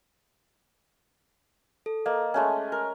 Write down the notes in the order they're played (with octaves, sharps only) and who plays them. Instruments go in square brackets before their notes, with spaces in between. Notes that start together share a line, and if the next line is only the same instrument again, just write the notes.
[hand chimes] A4
[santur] A#3 [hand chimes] D#5
[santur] G#3 A3 C#4
A#4